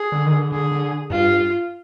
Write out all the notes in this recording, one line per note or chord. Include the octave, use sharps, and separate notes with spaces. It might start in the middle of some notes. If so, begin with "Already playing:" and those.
Already playing: G#4
D3
D#3
D3
D3 G#4
D3
G2 F4